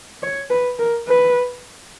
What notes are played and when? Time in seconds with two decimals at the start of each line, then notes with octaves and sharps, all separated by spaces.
0.23 C#5
0.50 B4
0.79 A#4
1.08 B4